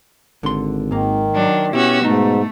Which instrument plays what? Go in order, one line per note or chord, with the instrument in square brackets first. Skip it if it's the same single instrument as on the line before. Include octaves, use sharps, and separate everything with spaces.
[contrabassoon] G#1 [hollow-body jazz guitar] D3 C6
[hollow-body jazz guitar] G#2 A#3 [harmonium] D#3
[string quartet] F#3 D4
[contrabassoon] B2 [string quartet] C#4 F#4 E6 [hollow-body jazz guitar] E4 [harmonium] G4
[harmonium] G#2 [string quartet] A3 [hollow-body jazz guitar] D#4